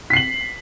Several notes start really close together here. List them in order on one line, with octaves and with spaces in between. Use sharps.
B6 C7 F#7